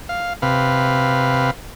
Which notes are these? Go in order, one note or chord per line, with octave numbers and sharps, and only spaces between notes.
F5
C3 B4 F5